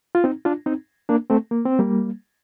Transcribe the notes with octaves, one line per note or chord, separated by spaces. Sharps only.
F4
C4 D#4
D4 F4
C4 D#4
A#3 D4
A3 C4
A#3
C4
G3 A#3